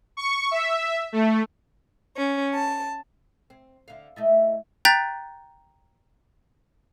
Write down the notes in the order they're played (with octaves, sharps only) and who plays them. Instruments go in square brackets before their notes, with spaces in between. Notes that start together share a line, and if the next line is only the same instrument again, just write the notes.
[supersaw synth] C#6
E5
A3
[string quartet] C#4
A5
[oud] C4
D3 F5
A3 D#4 E4
[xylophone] G5 A#5 F#6 G6 A6 B6